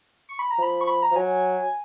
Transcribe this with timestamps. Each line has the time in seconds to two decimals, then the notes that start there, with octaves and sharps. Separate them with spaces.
0.29 C#6
0.39 B5
0.51 A#5
0.58 F3 B5
0.81 C#6
0.87 B5
1.03 A#5
1.11 F3
1.16 F#3 G#5